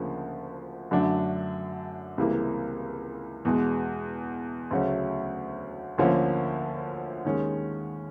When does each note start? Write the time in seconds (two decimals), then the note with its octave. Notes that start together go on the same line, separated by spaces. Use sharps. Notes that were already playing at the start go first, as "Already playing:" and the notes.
Already playing: D2 C#3 F3 A#3 D4
0.91 F#2 D3 F#3 A3 D4
2.18 C#2 C3 E3 G3 A#3
3.45 E2 B2 G#3
4.71 D2 C#3 F#3 A3 C#4
5.98 D2 D3 F3 A#3 C#4
7.25 D#2 D#3 G#3 C#4